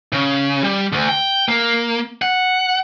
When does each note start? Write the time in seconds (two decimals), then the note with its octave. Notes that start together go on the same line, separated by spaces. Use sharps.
0.13 C#3
0.64 G3
0.92 D2
1.09 G5
1.48 A#3
2.22 F#5